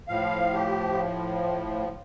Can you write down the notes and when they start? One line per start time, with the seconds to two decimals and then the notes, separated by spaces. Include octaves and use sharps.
0.08 A2 F3 F5
0.54 G4